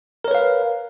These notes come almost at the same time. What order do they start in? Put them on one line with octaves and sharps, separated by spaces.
A#4 C#5 B4 F5